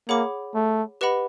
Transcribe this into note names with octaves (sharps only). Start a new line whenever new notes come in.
A#3 G#4 C#5 F#5 B5 D6
A3
G4 B4 D#5 F#5 B5